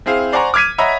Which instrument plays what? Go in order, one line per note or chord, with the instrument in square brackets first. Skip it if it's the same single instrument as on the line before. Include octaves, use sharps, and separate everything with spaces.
[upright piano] C4 E4 G#4 C5 F5
C5 D5 F#5 G#5 A#5 C#6
D6 F6 G#6 B6 D#7
C#5 D#5 E5 F#5 A#5 B5